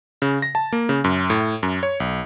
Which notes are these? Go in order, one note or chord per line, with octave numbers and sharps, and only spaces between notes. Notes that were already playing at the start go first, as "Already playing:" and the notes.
C#3
A#6
A5
A#3
C#3
F#2
A2
F#2
C#5
B1